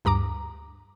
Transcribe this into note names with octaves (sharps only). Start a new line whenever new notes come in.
D2 G2 A#5 D6